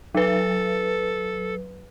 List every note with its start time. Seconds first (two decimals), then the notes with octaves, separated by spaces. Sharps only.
0.15 F#3 A4 B4